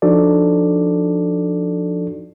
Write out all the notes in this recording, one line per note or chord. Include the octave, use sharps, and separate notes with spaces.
F3 D4 D#4 F#4 A4 D5